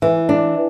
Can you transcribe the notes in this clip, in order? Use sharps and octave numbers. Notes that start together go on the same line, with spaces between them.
E3
D4